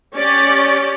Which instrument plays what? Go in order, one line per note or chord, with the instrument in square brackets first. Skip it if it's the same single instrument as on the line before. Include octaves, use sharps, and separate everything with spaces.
[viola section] C#4 G4 D5